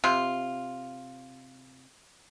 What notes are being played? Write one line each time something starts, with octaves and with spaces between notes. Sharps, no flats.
C3 F4